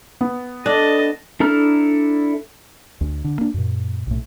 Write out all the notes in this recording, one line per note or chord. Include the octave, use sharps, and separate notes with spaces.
B3
D4 A4 D#5 A5
D4 E4 A4 A#5 F6
D2
D3
A#3 D4
F#2 A#2
B1 A2